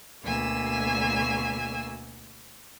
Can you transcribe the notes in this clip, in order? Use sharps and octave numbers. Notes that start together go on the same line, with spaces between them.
D2 B2 A#3 G#5 E6